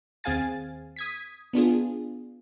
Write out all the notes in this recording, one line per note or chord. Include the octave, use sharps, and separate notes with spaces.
D#2 C4 G#4 F5 G#5 A6
D#6 G#6 B6
B3 D4 F4 G#4